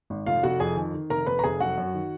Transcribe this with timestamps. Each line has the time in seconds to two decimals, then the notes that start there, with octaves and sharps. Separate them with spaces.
0.10 G#1
0.26 F1 F4 F5
0.43 F1 F#4 F#5
0.60 F2 G#4 G#5
0.76 D#3
0.94 D#3
1.10 F1 A#4 A#5
1.26 F1 B4 B5
1.39 A#5
1.44 F1 G#4 G#5
1.60 F#3 F#4 F#5
1.78 F#2
1.94 D#3